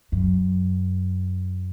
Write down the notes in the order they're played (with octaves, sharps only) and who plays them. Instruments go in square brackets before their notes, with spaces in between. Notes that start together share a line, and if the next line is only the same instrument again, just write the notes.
[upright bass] F#2